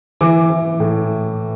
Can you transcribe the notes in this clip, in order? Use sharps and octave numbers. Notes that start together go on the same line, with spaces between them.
E3 D6
E3
A2